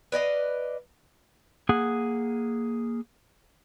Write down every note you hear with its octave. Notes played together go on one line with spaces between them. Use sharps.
B4 D5 D#5 F5
A#3 G#4 F#5